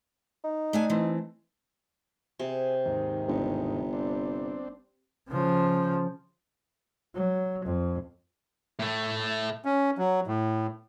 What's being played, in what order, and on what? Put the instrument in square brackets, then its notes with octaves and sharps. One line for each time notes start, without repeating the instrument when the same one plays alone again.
[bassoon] D#4
[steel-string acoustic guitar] A3 D4 G#5
E3 A3 C4
[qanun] C3 [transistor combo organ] G#4
[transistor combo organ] D#2 G#2 D#3
[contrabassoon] G1
[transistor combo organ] C4 D4
[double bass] C#3 F3
F#3
F2
[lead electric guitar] A2 A3
[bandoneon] C#4
F#3
A2